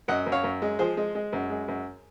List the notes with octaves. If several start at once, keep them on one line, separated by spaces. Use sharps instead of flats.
F#2 D#5 F#5
F#2
C#5 F5
F#2
G#3
F3 G#4 C5
G#3
G#3
F#2
G#3
F#2